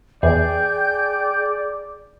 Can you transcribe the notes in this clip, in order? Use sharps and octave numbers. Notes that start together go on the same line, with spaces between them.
E2 G#4 D5 G5 G6